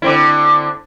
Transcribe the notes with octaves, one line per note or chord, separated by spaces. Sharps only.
D3 C4 E4